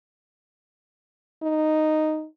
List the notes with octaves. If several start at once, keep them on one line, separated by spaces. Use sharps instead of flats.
D#4